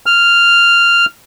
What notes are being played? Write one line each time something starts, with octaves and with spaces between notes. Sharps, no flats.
F6